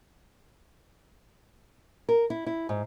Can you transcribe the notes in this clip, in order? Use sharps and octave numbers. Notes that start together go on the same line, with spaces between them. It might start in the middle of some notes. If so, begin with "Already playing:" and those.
A#4
E4
E4
G#2